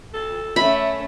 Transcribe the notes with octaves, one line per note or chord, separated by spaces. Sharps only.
A4
A3 C#4 E5 B5